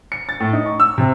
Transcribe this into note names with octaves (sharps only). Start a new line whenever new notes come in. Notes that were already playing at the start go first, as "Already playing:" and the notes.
C#7
A6
A2
D#4
C#6
E6
C3